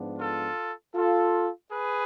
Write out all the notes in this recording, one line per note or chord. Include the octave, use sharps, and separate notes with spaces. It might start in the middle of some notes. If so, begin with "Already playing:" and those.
Already playing: G#2 F3 B3 D4
F4 A4
F4 A4
G#4 B4